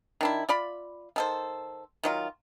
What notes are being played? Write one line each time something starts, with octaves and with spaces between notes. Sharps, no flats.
D#3 D4 E4
F4 D5 B5
D#3 A4 C5
D#3 F#3 F4